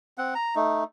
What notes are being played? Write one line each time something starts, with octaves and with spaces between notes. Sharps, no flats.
C4 F#5
A#5
A3 D#4